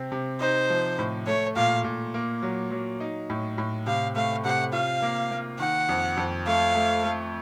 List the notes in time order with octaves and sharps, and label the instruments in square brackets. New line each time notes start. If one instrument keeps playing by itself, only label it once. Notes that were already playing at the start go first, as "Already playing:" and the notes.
Already playing: [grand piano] C3 C4
C3
[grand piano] D#4 [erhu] C5
[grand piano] F3
A2
[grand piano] A3 [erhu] C#5
[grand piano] A#2 [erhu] F5
[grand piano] A#2
A#3
F#3
F#3
D#4
A2
A2
[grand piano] C3 [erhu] F5
[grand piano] A3 [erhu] F5
[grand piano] C3 [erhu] F#5
[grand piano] F4 [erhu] F5
[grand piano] A#3
A#3
[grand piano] D#3 [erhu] F#5
[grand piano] F2
F2
[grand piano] A3 [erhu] F5
[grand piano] A3
A3